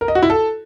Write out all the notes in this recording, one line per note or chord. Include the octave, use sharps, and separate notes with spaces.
A#4
D#5
F#4
E4
A4